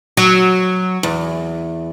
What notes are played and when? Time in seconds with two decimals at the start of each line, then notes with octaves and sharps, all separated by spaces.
0.17 F#3
1.03 E2